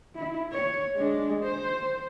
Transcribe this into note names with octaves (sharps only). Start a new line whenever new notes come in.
E4
C#5
G#3 D4
C5